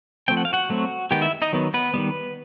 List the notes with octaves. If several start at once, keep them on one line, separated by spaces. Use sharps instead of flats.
F3 A3 C4 G5
F#5
F5
F#4 F#5
F#3 A3 C4
D#3 G#3 B3 G4 G5
E4 E5
D#4 D#5
D#3 F#3 B3
B3 B4
D#3 G3 B3